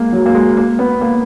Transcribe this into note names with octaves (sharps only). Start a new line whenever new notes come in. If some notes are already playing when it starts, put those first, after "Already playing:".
Already playing: G#3 A#3
F#3
A#3
G#3
A#3
B3
A#3